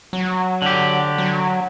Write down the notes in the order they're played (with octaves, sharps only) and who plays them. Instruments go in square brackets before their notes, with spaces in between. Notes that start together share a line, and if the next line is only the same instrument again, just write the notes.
[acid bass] F#3
[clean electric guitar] D3 G4
[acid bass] F#3